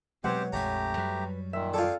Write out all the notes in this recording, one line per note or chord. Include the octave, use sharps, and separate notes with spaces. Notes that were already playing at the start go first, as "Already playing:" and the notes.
B2 F#3 G#3 C4 G4 C5 C#5 F#5
A#1 F2 G#3 A3 C#4 G4 A#5 B5
F#2 F#3 G3 B4
A#2 D#3 E5
C4 F4 G#4 A4 D5